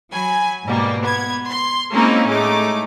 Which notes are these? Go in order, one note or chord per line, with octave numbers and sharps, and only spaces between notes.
F#3 G#5 B5
G#2 B2 G3 A#3
B3 G#6
C6
G#3 A#3 C4 C#4 D#4 E4
A2 G#3 A3 D#4 D6